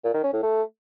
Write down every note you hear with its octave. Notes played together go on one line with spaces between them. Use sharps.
A#2
D#3
C#4
A2
A3